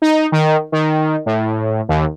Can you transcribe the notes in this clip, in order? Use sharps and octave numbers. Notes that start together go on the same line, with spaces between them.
D#4
D#3
D#3
A2
D#2